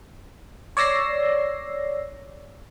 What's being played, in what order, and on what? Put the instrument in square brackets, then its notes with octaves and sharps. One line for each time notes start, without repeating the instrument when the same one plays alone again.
[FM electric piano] C#5 D5 E6 A#6 C7